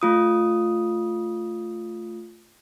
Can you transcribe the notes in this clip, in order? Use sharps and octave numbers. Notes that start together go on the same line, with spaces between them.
A3 F4 D#6